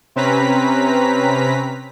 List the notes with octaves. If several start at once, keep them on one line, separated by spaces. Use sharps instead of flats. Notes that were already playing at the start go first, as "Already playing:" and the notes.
C3 C4 C#4 B4 A#5 B6